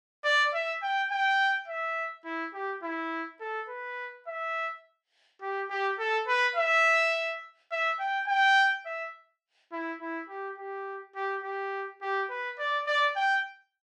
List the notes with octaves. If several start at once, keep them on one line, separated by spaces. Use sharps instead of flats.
D5
E5
G5
G5
E5
E4
G4
E4
A4
B4
E5
G4
G4
A4
B4
E5
E5
G5
G5
E5
E4
E4
G4
G4
G4
G4
G4
B4
D5
D5
G5